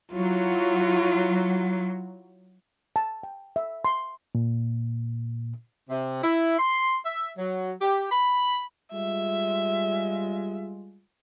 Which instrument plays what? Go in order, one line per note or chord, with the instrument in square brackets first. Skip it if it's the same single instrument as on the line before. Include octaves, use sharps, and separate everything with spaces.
[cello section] F#3 [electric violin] E4 F4
[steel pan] A5
G5
E5
C6
[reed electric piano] A#2
[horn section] C3
E4
C6
E5
F#3
G4
B5
[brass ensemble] G3 G#3 F4 [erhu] E5